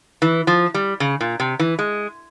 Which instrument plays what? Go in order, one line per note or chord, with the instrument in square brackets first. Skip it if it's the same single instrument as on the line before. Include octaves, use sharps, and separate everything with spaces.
[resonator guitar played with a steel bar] E3
F3
G3
C#3
A#2
C3
E3
G#3